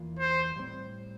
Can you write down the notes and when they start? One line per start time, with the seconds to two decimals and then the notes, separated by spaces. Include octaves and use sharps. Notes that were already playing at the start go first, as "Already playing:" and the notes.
Already playing: E2 E3 A#3 F4
0.19 C5
0.56 A2 G3 C4